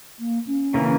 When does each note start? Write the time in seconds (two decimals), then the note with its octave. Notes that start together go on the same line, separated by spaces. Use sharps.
0.19 A#3
0.47 C#4
0.74 C#3 E3 A#3